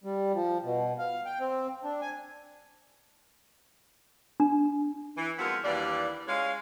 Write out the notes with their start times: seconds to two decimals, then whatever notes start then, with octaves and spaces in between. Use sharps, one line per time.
0.04 G3
0.34 F3
0.64 B2
0.99 F5
1.26 G5
1.40 C4
1.84 D4
2.01 G#5
4.40 D4
5.17 E3
5.39 F3 G#3 B3 C4 F#4 A#4
5.64 D#2 E3 G3 D4 D5 F5
6.27 G#3 C#4 F5